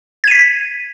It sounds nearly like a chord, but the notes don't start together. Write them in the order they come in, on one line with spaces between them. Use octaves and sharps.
G#6 D#7 B6